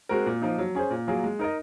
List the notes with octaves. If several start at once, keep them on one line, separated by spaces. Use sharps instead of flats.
G#3 C4 F#4 A#4
A#2
F3 A#3 D#4
F#3
C#4 G#4 C5
A#2
F#3 A#3 F4 G#4
G#3
D#4 A#4 D#5